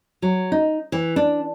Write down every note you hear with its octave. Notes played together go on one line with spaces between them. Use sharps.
F#3
D#4
E3
D4